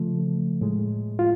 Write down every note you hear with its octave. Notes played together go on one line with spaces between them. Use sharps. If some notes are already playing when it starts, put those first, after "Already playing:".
Already playing: C#3 F3 A3
A2 G#3
F4